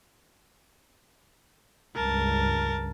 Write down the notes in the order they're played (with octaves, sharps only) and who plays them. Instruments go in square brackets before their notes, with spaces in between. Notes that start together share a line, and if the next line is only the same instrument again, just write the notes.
[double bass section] C#2 G2 [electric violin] A#4 A5